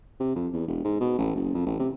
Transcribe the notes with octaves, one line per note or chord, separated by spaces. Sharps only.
C3
F2
E2
E1
G#2
B2
A1
F#1
F2
A1
C3